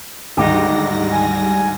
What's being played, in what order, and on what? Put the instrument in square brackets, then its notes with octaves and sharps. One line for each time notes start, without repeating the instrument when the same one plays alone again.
[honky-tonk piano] D2 G#2 D#3 [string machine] G3 A#6 [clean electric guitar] D#4 G4
[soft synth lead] G#5